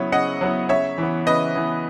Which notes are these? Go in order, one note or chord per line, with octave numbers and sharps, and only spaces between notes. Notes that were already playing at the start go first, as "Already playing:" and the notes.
Already playing: C#3 F#3 B3 E4 C#5
C#3 D#5 F#5
F#3 B3 E4
C#3 C#5 E5
E3 B3
C#3 B4 D#5
E3 B3